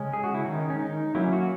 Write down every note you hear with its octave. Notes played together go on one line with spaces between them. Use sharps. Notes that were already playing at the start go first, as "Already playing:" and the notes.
Already playing: C#3 G#3 C#4
G#4
F#4
E4
D#3 G#3 C#4 D#4
C#4
D#4
F#3 A#3 C#4 E4
F#4